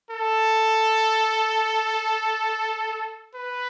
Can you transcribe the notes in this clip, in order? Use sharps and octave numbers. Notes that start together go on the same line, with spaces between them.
A4
B4